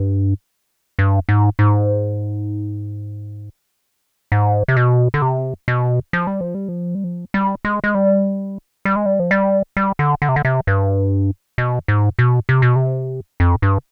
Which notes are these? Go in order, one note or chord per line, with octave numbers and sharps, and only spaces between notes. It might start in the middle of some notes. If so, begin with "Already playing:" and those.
Already playing: G2
G2
G#2
G#2
G#2
C3
B2
D3
C3
B2
F3
G3
F3
G3
F3
G3
F3
G3
G#3
G#3
G3
G3
G#3
G3
F3
G3
G3
D3
D3
C3
D3
C3
G2
B2
G#2
B2
C3
B2
C3
F2
G2